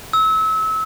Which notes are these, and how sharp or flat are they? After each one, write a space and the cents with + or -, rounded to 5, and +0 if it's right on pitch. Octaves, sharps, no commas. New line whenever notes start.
E6 -30